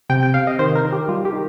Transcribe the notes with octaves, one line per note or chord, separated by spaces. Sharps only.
C3 G5
G5
C3 F5
D#5
D#3 C5
A#4
D#3
G4
G3 F4
G4
D#3